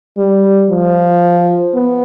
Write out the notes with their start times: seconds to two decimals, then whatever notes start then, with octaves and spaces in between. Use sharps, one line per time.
0.18 G3
0.70 F3
1.74 B3